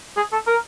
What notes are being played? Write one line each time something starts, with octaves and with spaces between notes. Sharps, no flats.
G#4
A4
A#4